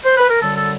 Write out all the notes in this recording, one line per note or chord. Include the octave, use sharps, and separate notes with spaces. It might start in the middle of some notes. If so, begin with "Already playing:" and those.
C5
B4
A#4
F#2 D3 G3 A4
A4